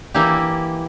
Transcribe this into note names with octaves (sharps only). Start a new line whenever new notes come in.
E3 A#3 E4 G4